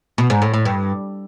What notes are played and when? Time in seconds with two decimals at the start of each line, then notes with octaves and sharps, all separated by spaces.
0.18 B2
0.30 G#2
0.42 A2
0.54 A2
0.65 G2